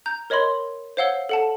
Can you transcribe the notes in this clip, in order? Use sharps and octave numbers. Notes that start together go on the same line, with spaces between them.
A#5 G6
A#4 C#5 D#5 B5 C6
C5 C#5 F5 F#5 E6 G7
A4 F#5 A5